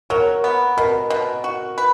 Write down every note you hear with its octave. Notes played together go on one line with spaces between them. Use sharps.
F#3 A#4
B3
B2 A#4
B2
F#4
B4